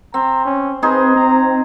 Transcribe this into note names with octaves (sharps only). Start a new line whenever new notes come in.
C4 A#5
C#4
C4 D#4 G#4 B4 C5
C4 A#5